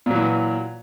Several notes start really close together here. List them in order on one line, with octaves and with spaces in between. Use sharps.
A#2 F#3 E3